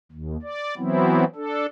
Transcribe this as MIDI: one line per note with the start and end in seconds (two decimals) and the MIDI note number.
0.12 0.37 39
0.42 0.74 74
0.78 1.24 52
0.78 1.24 54
0.78 1.24 59
0.78 1.24 60
0.78 1.24 64
1.36 1.66 62
1.36 1.66 69